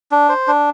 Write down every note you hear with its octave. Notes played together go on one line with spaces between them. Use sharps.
D4
C5
D4